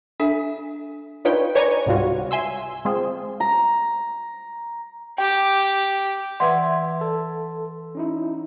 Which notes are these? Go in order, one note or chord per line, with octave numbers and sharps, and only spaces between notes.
D4 A4 E5 G#5
D4 D#4 F4 B4 C#5 G5
B4 C#5 D5 G#5 A#5 C#6
C#2 G#2 C3 G3 F4 F#4
E5 G#5 C6 E6
G#3 C4 F4 G#4
A#5
G4 G5 D6
E3 B4 D5 E5 F#5 C6 G#6
A4
C#4 D#4 E4